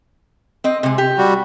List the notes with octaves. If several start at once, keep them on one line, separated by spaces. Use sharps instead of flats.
C4 D#5
C3 G#3
G4
G3 F#4